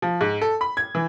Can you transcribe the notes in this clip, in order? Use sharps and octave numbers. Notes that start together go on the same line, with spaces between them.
F3
G#2
A4
B5
G#6
E3